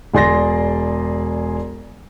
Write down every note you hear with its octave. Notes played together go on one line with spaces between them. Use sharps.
E1 G#4 D5 C6 A6 A#6